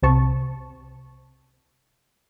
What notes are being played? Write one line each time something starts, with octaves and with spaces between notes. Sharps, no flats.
C2 C3 C4 A5 C#6